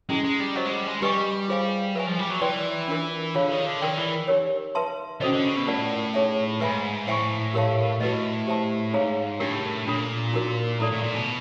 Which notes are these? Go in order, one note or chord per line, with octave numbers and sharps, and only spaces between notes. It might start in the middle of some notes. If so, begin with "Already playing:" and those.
G#3 C#4 E4 G#4
G#3
G3
F#3 C5 D#5 F#5
G#3
G3
G#3
G3 G4 B4 D#5 G#5 C#6
F4 G#4 C5 F5 G#5
F#3 B4 E5 G#5
F3
G3
F#3
E3 B4 D5 G5 C6
D4 F4 A#4
D3 F4 G#4 C#5 F5
D#3
D3
D#3 A#4 D5 G5
E3
D#4 G4 A#4 C#5
B4 E5 A5 C6
D3 C#4 F#4 A4 C5 D#5
D3
C#3
B2
A2 F4 A#4 D5 F#5
D#4 G#4 C#5 E5
G#2 B4 E5 G#5 B5
A2 C5 E5 G#5 C#6
G4 A#4 C#5 F5 A5
A2 F#4 B4 D#5
G4 C5 E5 A5
G#2 D#4 G#4 C#5 F5 A#5
A2 D4 G4 A#4
A#2 D4 F4 A4
D#4 F#4 A#4
A2 E4 A4 D5
A2
A#2
B2